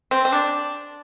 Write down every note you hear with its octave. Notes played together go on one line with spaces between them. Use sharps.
C4
C4
D4